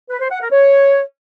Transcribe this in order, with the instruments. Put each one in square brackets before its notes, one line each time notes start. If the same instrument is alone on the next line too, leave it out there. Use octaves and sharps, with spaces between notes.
[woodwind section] B4
C5
F#5
A#4
C#5